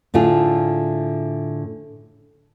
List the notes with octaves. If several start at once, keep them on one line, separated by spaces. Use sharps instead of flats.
A2 D3 A3 F4 G#4